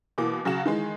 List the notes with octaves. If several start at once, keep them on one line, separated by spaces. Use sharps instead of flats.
B2 E3 A#3 D6
C#3 F#3 F#4 F#5 E7
D#3 E3 G#3